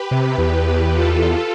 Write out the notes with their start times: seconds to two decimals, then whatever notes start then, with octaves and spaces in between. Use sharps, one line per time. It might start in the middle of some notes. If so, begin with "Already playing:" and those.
Already playing: G4 B4
0.11 C3
0.38 E2
0.92 F4 A4